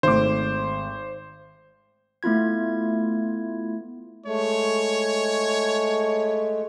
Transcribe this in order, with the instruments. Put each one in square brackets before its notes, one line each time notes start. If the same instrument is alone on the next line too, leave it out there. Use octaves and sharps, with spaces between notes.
[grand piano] G#1 A3 D6 [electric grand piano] C5
[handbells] A3 B3 E4 F4 G#6
[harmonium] G#3 A3 [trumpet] C#5